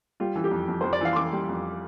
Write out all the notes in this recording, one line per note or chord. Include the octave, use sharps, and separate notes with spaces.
G3 F4
E3
G4
F2
F2
F2 C5
D5
E3 F5
C6
E3 D6
G3
F2